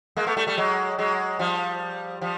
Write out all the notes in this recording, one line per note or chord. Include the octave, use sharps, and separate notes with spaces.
G#3 A#3
A3 B3
G3 A3
G3 A3
F#3 G#3
F#3 G#3
F3 G3
F3 G3